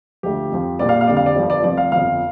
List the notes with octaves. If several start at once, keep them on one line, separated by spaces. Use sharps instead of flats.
D2 D3 F3 G4
F2 F3
A#1 A#2 G3 D5
F5
F5
F2 D3 G3 D5
F5
D5
G1 G2 F3
D5
F1 F2 F3 D5
F5
G1 F2 F3 F5